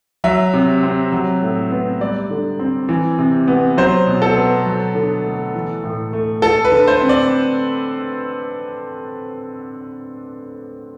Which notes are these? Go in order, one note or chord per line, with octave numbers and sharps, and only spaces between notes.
F#3 E5
C3
C4
F#3
A2
B3
G3 D5
D3
C4
E3
C3
B3
F#3 C5
B2
A4
B3
F#3
D3
A3
E3
A2
A3
A3 A4
B4
D3
C5
C4
D5